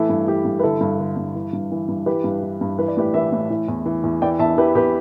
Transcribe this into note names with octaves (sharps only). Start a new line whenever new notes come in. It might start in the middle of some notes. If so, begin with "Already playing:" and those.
Already playing: A2 E3 E4 A4
G2
E3 G4
G2
B4
D3 E4 A4
G2
D3
G2
E3
G2
E3
G2
E3 G4 B4
G2
E3
G2
E3 B4
D5
A2 G4 B4
E3 B4 E5
A2
E3
E2
E3
E2
E3 D5 G5
E2 E5 A5
E3 G4 B4
E2 G4 B4